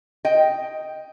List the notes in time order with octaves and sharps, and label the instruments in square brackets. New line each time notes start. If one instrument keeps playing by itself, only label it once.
[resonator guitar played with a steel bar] D#5 G5